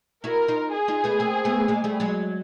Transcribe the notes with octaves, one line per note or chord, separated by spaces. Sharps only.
E4 F#4 A#4
D#4 F4
G#4
D#4 F4
A3 B3
A#3 C4
A3 B3
G#3 A#3
G3 A3
F#3 G#3